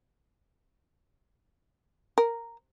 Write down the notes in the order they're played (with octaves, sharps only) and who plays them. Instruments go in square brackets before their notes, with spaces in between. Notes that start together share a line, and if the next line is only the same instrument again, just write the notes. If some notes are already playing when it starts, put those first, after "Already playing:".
[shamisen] A#4